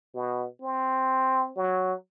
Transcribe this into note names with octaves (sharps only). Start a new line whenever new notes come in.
B2
C4
F#3